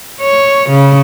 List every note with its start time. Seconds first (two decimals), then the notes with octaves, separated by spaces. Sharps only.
0.21 C#5
0.70 C#3